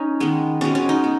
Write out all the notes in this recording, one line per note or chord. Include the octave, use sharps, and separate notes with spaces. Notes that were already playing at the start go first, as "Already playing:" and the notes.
Already playing: C#4 D#4
D#3 G#3 B3
B2 G#3 B3 C#4
C#4
D#4
B3